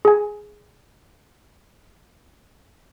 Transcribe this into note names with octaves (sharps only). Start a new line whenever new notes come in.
G#4 G#5